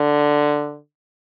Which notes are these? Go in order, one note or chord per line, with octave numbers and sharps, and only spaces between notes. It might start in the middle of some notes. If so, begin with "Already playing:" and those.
Already playing: D3